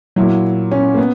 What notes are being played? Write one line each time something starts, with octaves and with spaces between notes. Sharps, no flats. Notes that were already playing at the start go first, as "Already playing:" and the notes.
A#2 F#3 E4
C#4
A#3
B3